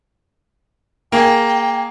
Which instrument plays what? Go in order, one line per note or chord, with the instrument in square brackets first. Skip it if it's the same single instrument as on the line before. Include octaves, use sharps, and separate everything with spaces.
[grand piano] A#3 G#4 [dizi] G5